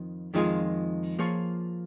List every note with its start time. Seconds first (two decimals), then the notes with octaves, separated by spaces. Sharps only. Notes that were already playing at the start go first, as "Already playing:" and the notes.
Already playing: F2 D#3
0.34 F2 D#3 G#3 F4 G#4
1.19 F3 A#3 F4 G#4 C#5